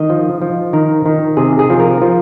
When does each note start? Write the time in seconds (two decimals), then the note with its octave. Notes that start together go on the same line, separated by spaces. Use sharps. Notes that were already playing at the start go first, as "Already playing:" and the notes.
Already playing: D#3 D#5
0.10 F3
0.42 F3
0.73 D#3 A#4
1.06 D#3
1.37 C3 G#4
1.59 G#4
1.70 F3
1.80 A#4
2.02 F3